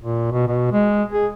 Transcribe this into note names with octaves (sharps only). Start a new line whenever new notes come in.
A#2
B2
B2
G#3
G#4